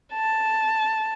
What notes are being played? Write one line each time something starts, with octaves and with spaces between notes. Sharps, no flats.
A5